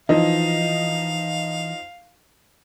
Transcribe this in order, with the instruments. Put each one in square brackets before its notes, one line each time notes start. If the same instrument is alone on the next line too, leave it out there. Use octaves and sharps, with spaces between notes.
[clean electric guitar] E3 [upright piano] F3 D#4 [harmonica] F5